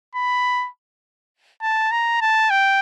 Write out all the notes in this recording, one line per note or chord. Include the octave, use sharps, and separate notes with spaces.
B5
A5
A#5
A5
G5